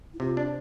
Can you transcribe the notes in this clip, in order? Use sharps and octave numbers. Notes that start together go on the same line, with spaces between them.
E4
C3 F4
D4
C5